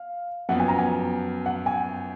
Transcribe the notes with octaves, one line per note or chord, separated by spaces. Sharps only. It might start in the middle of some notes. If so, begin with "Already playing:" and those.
Already playing: F5
F#2 F3 B3 F#5
G#5
A#5
G#5
F#5
G#5